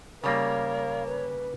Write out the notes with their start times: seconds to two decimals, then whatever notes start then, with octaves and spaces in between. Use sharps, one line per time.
0.24 C#3 G3 A#3 A#4 C#5 F5
1.07 B4